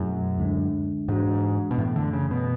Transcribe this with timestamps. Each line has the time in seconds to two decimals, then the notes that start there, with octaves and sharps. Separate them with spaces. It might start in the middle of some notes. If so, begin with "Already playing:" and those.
Already playing: F#2 B2 A3 E4 G#4
0.38 D2 D3 G#3 D4
1.08 G#2 E3 G#3 D4 F#4
1.71 B2
1.78 F#2 A2 E3 A3
1.96 D3
2.13 C#3
2.31 B2